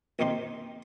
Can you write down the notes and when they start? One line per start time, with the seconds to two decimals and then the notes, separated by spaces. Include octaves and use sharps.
0.19 A#1 F2 D#3 D#4 G4 C6